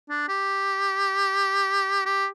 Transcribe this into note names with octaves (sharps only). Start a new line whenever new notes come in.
D4
G4
G4